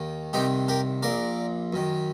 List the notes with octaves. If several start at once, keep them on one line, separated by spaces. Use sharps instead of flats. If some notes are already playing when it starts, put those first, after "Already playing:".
Already playing: D#2 D#3
C2 C3 D#3 D#4 G4
G4 A#4
A#1 A#2 A#4 D5
F#2 D#3